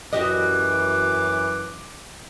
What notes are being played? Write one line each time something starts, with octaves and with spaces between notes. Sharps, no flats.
F#2 E3 F#4 G4 D#5 F#5 D6